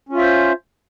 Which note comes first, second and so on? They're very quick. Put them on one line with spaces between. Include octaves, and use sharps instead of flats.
C#4 F4 E5 C5